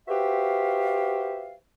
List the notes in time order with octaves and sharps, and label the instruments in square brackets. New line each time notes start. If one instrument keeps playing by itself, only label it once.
[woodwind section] F#4 G4 B4 C5 E5 F5